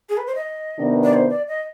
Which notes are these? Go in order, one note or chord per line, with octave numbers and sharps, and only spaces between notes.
G#4
B4
C5
D#5
C3 D#3 B3 D4
D5
C5
D5
D#5